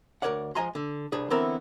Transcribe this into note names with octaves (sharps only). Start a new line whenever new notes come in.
D2 D#3 A#4 C#5 D5 F#5
F3 G#3 D#5 G#5 A#5 C6
D3
C2 D4 G#4 B4
D3 E3 B3 C4 E4 A#4